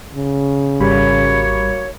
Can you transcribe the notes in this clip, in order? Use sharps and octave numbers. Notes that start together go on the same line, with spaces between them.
C#3
G#1 G3 A#3 F#4 C#5 B5